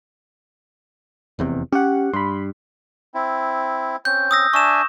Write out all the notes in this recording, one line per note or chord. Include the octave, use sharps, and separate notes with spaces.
F1 E2 C3
C#4 G4 F#5
G2 B5 C6
C4 E4
C4 C#4 G6
D#6 E6 A#6
D4 E5 G#5 C#6 E7